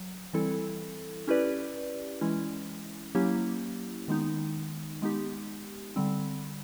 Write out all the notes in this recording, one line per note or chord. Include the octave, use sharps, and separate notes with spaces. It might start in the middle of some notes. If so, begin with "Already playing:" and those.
Already playing: F#3
E3 G3 C4 E4 A4
C#4 E4 G4 B4 D5
E3 G#3 C#4 E4
F#3 A#3 C#4 E4 G4
D#3 G#3 B3 D#4
G#3 B3 D#4 G4
D3 G3 C4